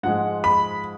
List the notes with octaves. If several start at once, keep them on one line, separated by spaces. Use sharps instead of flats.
G#2 F3 G#3 F#5
B5